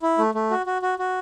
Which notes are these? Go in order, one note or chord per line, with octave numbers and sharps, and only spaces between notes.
E4
A3
A3
F#4
F#4
F#4
F#4